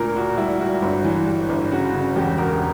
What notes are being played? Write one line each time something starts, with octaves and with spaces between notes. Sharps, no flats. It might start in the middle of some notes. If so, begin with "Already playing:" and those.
Already playing: D2 A#2 A#4
A#2 F#4
G3 E4
G3 F#4
G1
E3
G3
G1
C#3 F#4
C#3
E2 G4
E1 A#4